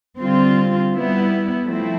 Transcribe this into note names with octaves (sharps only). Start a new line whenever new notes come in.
D3 G3 C4 F4
G3 B3 E4
F3 A3 C4 E4